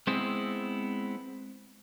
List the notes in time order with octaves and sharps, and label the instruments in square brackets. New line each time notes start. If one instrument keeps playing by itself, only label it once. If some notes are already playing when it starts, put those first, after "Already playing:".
[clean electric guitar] G#3 B3 C4 E4 G#4